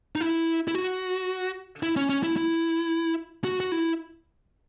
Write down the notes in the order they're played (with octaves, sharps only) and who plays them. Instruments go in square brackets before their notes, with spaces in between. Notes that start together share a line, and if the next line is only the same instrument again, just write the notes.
[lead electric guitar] D#4
E4
E4
F#4
E4
C#4
C#4
E4
E4
F#4
F#4
E4